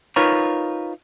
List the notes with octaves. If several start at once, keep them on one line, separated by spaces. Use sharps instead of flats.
D#4 F4 A#4 B4 C#5